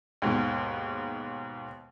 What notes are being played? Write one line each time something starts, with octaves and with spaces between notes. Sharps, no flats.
D#2 G#2 B2